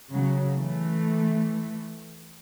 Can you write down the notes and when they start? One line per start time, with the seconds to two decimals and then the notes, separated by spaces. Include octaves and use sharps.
0.13 C#3 F#3
0.54 E3 A3